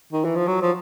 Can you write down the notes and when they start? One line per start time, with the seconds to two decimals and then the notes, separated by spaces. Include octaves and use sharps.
0.13 D#3
0.25 E3
0.36 F3
0.47 F#3
0.62 F3